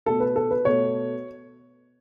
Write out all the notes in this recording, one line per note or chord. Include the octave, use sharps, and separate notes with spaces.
B2 A3 A4
B4
A4
B4
B2 A3 C#5